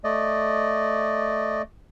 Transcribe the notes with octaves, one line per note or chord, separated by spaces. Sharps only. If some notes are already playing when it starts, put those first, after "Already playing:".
A3 D5 D#5